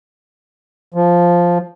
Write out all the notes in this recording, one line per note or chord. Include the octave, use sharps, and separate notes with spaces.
F3